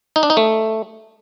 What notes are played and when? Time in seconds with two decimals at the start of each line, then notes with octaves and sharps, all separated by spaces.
0.16 D#4
0.23 D4
0.30 D#4
0.37 A3